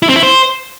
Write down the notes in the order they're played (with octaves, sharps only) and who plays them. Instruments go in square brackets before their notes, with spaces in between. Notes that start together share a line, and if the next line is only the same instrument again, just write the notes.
[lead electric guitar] E4
C4
E4
C5